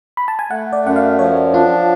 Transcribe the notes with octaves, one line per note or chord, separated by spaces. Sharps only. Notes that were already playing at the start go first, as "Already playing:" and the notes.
B5
A5
G#5
A3 F#5
D5
F#2 F#5
F5
F3 C#5
D4 F4